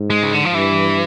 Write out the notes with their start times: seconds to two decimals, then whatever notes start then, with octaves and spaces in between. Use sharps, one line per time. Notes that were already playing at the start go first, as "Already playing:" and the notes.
Already playing: G#2
0.10 G#3
0.23 C#3
0.33 D3
0.45 F3
0.54 G2 E3